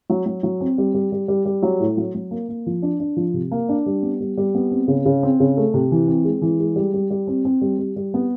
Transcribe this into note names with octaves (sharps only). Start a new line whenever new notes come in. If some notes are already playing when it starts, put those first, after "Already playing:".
F#3
F#3
F#3
C4
G3
G3
G3
G3
G3
F#3
A2
F#3
F#3
A#3
A#3
F3
D4
D4
F3
C3
A#3
D4
G3
B3
G3
G3
B3
C4
C#3
C#3
C4
C#3
A3
C3
E3
C4
G#3
E3
G#3
G3
G3
G3
C4
C4
G3
G3
G3
B3